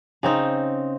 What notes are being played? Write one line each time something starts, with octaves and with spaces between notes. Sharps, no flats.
C#3 C4 D#4